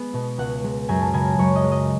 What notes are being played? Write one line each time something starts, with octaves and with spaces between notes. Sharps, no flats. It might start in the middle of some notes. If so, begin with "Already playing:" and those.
Already playing: G#3 B3
B2
C#2 F#5
G#3
F#2 G#5
A5
C#3 G#5
F#2 C#5
D#5
G#3
D#5